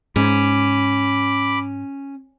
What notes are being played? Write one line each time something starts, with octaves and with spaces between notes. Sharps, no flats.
G#2 C#4 B5 D6